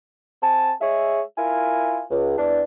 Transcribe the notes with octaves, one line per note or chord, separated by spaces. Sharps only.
C4 G#5 A5
G#3 G#4 C#5 E5
E4 F4 A#4 G#5
C#2
E2 D4